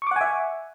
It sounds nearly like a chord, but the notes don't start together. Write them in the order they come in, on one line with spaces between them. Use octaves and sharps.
C#6 D6 F#5 G#5 E5